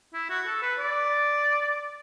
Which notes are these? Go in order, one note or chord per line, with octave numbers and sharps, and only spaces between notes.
E4
F#4
A4
B4
D5